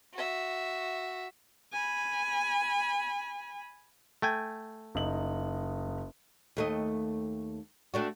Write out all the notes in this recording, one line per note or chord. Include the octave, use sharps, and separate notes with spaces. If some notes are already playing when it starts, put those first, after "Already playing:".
F#4 E5
G#5 B5
A3 G5 G#5
F#1 D#4 F#7
D#2 A3 D#5
A3 D4 F#4